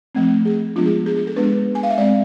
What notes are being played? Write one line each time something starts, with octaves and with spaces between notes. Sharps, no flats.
F3 A3 C4
G#4
F3 G#3 B3 D4 F4
G#4
G#4
G#4
A4
G#3 B3 D4 B4
G#5
F5
E5
G#3 C4 D5